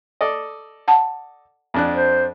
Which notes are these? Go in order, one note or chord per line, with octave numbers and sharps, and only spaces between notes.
A4 D5 D#5
F#5 A5
F2 D4 F#6
C5